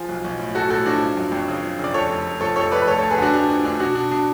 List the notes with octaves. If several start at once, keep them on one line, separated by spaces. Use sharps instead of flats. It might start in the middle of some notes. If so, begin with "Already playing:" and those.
Already playing: F3 G#4
B1
B1
A2
A2 F#4 A4
A2 F#4 A4
F3 D4 F#4
F3
F#2
G#1
C#3
F3
C#3 D5
F2 A4 C#5
F1
F1
F3 A4 C#5
F1 A4 C#5
F2 B4 D5
B4
D2 A4 C#5
D2 A4 C#5
G#4 B4
D3 D4 F#4
D2 D4
F3 D4
D2 D4
B2 D4 F#4
B2 D4
B2 D4